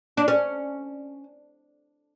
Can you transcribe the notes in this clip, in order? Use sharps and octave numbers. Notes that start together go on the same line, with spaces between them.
D4
C#4